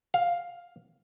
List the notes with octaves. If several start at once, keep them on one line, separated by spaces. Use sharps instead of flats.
F5